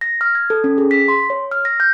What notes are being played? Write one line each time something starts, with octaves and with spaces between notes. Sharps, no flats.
A#6
F6
G#6
A4
C#4
G#4
B6
C6
C#5
F6
A#6
G6